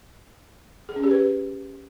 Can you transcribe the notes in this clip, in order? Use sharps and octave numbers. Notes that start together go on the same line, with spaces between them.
G#4
C#4
G4
B4